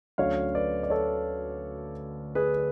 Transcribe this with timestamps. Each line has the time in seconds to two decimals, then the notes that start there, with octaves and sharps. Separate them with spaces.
0.18 D2 D3 F#3 C#4 C#5 F5
0.54 B4 D5
0.83 D5
0.90 A4 C#5
2.35 G#4 B4